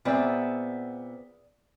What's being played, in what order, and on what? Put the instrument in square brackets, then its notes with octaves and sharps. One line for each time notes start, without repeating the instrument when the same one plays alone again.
[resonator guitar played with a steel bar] A#2 B3 C4 [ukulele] G#4 D5 E5